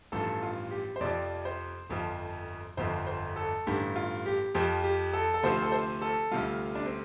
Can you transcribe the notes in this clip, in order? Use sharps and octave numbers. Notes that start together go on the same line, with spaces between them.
A1 G2 F3 A4
F4
G4
C5
F2 C3 F3 D5
C5
G1 F2 F3
G1 F2 F3 C5
C5
A4
A1 G2 D3 G4
F4
G4
F2 F3 G4
G4
A4
A4
D2 C3 F3 C5
A4
C5
A4
D2 C3 G3 F4
D4
C4